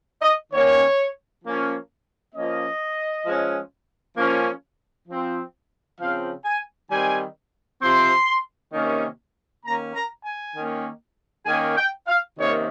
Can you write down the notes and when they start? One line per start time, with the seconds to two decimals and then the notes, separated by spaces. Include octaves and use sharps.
0.22 D#5
0.52 D#3 A#3 C#4 C#5
1.44 F3 A#3 C#4
2.35 F3 A#3 C#4 D#5
3.26 F3 G#3 C#4
4.17 F3 A#3 C#4
5.08 F3 C4
5.99 C#3 F3 C4 F5
6.45 G#5
6.91 D#3 G3 C4 G#5
7.82 C3 F3 C4 C6
8.73 C3 D#3 A#3 C#4
9.64 D#3 A#3 C#4 A#5
9.94 A#5
10.24 G#5
10.55 D#3 A#3 C#4
11.46 D#3 A#3 C#4 G#5
11.77 G5
12.07 F5
12.38 C3 D#3 A#3 C#4 C#5